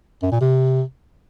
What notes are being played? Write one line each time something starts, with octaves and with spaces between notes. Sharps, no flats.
F#2
A#2
C3